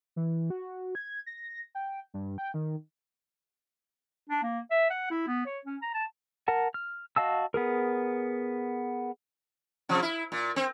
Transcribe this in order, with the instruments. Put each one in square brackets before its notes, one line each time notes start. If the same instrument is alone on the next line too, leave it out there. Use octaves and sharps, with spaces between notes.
[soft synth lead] E3
F#4
G#6
A#6
G5
G2
G5
D#3
[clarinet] D4
A#3
E5
F#5
E4
B3
C#5
C#4
A#5
A5
[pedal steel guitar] A#4 F#5 A5
F6
F#4 D#5 F5 A5 E6
B3 G#4 A#4
[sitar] C3 F3
E4
A#2
C4